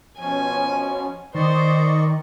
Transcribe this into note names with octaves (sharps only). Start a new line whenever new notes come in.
B2 F3 C#4 G#5
D#3 C5 D5 D#5 C#6